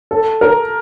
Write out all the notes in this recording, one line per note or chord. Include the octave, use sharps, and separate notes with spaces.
A4
A#4